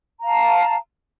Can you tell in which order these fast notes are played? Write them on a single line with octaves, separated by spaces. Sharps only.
A#5 F5 A5